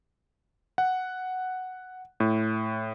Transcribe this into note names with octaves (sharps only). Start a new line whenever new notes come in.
F#5
A2